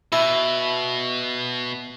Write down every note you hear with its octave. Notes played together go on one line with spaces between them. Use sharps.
B2 E4